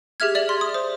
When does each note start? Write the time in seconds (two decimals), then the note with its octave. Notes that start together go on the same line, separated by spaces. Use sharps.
0.20 G4 G#4 E5 F6 G#6
0.35 D5 E5 F#7
0.49 C6
0.61 D#6
0.74 C5